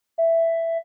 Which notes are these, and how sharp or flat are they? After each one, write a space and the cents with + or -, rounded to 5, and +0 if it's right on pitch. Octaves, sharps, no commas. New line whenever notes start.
E5 +5